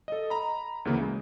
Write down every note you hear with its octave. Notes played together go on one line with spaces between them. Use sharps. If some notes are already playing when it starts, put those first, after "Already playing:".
A4 D#5
A#5 B5
D2 C#3 E3 A#3
G#3